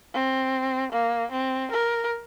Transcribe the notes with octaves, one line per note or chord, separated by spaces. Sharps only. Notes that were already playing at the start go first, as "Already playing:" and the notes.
C4
A#3
C4
A#4